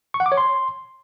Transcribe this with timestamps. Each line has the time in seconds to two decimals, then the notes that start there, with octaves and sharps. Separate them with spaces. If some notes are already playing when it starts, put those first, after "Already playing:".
0.14 C#6
0.20 F#5
0.26 D6
0.32 C#5
0.37 C6